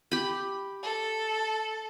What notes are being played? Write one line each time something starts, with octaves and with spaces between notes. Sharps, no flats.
G4 B5
A4